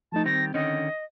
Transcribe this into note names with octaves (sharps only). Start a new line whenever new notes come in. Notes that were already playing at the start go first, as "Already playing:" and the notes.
F3 A3 D#4 A5
D#3 G3 C4 A#6
D3 D#3 C#4 D#5